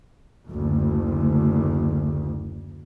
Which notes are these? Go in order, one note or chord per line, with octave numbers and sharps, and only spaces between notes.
F#1 D2